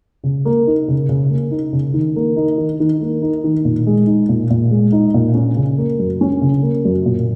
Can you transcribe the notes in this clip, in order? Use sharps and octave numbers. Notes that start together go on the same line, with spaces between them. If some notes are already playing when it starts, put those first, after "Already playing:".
C#3
A#3
D#4
C#3
C#3
A#3
D#4
C#3
D#3
A#3
D#4
D#3
D#3
A#3
D#4
D#3
A#2
G#3
D#4
A#2
A#2
G#3
D#4
A#2
C#4
C#3
A#3
F#2
C#4
C#3
A#3
F#2
A#2